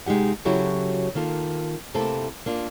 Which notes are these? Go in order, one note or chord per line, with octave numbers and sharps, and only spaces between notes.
C3 G#3 D#4 G4 F#5
C#3 F#3 E4 F#4 G4 A4
D#3 A#3 F4 A4
C3 A3 A#3 C4 E4 A4
A#3 D4 F4